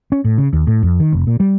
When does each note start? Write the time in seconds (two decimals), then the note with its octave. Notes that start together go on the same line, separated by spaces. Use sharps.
0.12 C#4
0.24 A2
0.38 C#3
0.53 D#2
0.67 A2
0.83 F2
1.00 D#3
1.13 F1
1.27 A#2
1.40 G3